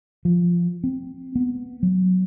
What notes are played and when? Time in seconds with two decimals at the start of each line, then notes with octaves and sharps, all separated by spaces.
0.25 F3
0.84 C4
1.36 B3
1.83 F#3